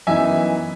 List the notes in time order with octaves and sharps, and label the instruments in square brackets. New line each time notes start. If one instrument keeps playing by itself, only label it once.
[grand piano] F#2 E3 B3 D#4 [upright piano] E5 G#5